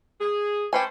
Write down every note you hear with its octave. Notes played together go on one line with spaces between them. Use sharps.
G#4
A3 C#4 G4 B4 C5 G#5